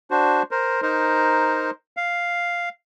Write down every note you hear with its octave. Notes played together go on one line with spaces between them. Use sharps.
D4 F#4 C5
A#4 C5
D#4 A#4 C5
F5